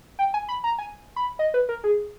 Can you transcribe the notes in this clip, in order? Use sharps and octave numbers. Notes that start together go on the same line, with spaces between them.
G5
G#5
B5
A#5
G#5
B5
D#5
B4
A#4
G#4